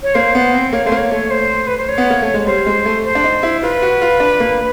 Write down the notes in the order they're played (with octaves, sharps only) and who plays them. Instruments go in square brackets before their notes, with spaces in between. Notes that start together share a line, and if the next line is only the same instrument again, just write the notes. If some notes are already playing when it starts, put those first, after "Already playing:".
[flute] C#5
[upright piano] A#3 [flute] C5
[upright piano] B3
C4
[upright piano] A#3 [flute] C#5
[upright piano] A3 [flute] C5
[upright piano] A#3
[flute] C#5
[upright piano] A3
[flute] C5
B4
C5
C#5
[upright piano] B3
A#3
A3
G#3
[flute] C#5
[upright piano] G3 [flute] C5
[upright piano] G#3
A3
[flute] C5
[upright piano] D4
D#4
E4
[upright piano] F4 [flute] B4
[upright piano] F#4
F4
D4
A#3